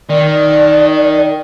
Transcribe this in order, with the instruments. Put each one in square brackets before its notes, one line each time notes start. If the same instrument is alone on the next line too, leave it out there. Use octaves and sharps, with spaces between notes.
[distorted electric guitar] D#3 [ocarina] D5